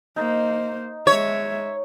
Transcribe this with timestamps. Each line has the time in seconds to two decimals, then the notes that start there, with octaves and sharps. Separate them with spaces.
0.16 A#3 D#4 C5
1.07 G#3 C#5 E5